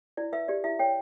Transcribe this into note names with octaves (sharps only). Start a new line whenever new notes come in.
E4 D5
B4 E5
G4 D5
E4 E5
C#5 G5